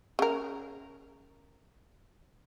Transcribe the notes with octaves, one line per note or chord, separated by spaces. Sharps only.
C#3 A#4